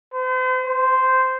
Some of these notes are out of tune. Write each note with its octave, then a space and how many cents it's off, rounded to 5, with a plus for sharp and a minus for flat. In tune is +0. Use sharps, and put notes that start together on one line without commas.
C5 -40
C5 -10